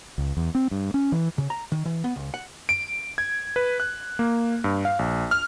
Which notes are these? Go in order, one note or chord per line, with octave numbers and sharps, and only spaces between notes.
C#2
E2
C4
G2
C#4
E3
C#3
A#5
D#3
E3
B3
C#2
F#5
D7
G#6
B4
F#6
A#3
G2
F5
A#1
F6